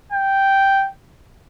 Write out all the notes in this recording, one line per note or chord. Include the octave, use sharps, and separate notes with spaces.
G5